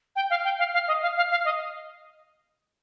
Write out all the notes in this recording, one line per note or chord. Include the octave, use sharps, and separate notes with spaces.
G5
F5
G5
F5
F5
D#5
F5
F5
F5
D#5